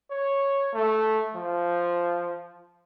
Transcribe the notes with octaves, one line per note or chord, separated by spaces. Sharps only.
C#5
A3
F3